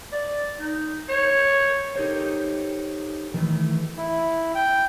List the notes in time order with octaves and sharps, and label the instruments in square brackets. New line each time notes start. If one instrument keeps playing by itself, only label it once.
[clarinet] D5
D#4
C#5
[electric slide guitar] D#4 G4 A4 A#4 C5 C#5
D#3 E3 A3
[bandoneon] E4
G5